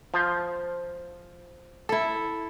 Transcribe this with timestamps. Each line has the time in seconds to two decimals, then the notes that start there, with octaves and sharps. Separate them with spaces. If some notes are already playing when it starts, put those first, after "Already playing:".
0.14 F3 F4 C5
1.89 E4 A4